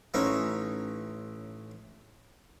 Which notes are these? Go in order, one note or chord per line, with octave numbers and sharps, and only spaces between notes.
A1 C#4 D#4 E4